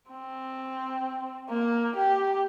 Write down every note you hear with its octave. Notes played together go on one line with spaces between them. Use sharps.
C4
A#3
G4